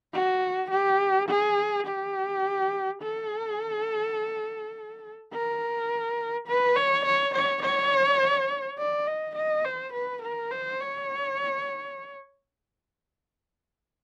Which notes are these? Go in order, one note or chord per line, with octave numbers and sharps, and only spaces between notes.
F#4
G4
G#4
G4
A4
A#4
B4
C#5
C#5
C#5
C#5
D5
D#5
D#5
C5
B4
A#4
C5
C#5